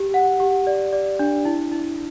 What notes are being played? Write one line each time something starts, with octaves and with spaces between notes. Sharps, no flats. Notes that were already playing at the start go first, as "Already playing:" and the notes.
Already playing: G4
F#5
G4
D5
D5
D4
E4
E4